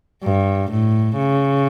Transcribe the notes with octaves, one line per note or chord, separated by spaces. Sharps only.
G2
A2
C#3